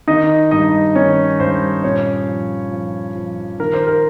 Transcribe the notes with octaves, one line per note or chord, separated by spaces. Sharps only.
D#3 D#4 D#5
G2 D#4 D#5
D#3 C#4 C#5
G2 C5
A#2 C#4 C#5
F3
F3
F3
D#3 A#4
C5
A#4